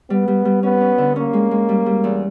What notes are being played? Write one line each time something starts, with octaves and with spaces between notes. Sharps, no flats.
G3 B3
G3
G3
B3 C#4
C#4
D3
A#3 C#4
G#3
G#3
G3
G3
E2